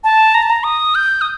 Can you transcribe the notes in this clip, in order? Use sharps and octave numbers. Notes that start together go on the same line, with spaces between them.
A5
A#5
A5
A#5
D#6
G6
D#6